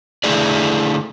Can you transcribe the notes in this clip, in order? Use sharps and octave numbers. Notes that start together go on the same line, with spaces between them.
D3 A3 E4 G#4 D5